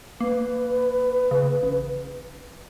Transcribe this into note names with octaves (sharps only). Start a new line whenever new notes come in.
A#3 B4
C#3
A1